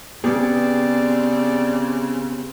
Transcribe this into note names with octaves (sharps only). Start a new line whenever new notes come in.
C#3 B3 C4 G4 G#4 D5